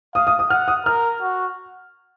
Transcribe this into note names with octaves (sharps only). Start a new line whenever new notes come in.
F5 D#6
D#6
D#6
F#5 F6
D#6
A#4 F6
F#4